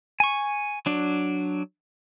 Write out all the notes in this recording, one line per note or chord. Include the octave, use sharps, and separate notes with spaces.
G#5 C#6
F#3 D4